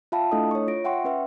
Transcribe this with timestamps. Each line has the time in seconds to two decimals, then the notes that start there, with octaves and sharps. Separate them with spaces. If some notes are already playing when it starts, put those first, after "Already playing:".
0.12 F4 E5 F5 G5 A5 B5
0.31 A3 D4 E4 A4 D#5 D#6
0.51 C#5 C#6
0.68 F4 A#6 D7
0.84 E5 F#5 G5 C6 C#6
1.04 C#4 B4 E5